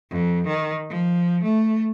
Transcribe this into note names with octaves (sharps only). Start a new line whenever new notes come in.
F2
D#3
F3
A3